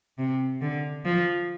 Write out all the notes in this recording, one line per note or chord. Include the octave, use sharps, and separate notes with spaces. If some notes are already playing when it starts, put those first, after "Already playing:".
C3
D3
F3